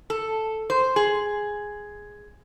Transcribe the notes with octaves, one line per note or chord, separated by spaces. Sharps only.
A4
C5
G#4